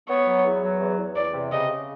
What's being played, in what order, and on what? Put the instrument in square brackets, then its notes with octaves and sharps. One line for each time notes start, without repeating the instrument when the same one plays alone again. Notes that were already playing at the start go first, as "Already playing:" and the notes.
[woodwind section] B3 [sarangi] C#5
[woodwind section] F#3
E2
F#3
E2
E2
[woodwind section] E2 [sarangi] D5
[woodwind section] C3
[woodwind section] C#3 [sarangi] D#5
[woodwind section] C#3